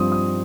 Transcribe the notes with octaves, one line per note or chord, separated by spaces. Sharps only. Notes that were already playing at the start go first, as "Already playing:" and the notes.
Already playing: G2 F3 C4 D#6
D#6